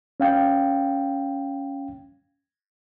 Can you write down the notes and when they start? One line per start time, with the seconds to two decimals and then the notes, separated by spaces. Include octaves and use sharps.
0.20 C#4 F5 G5